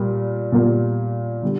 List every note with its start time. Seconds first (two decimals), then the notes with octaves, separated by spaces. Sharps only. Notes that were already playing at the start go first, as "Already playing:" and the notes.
Already playing: A#2 G3 A#3
0.52 A#2 G3 A#3
1.42 D3 G3